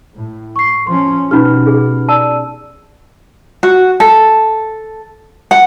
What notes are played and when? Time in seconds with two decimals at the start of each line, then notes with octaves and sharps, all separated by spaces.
0.15 A2
0.56 C#6 C7
0.87 F3 C#4 C6
1.31 B2 C#4 D#4 G4 B4 B5 F6
1.67 G#4
2.09 D5 A5 E6
3.63 F#4
4.00 A4
5.51 F#5